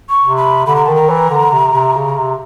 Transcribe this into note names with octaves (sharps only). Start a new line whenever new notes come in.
C#6
C3
B5
D3 B5
A#5
D#3 A5
A#5
E3
D3
C3
C3
C#3
C3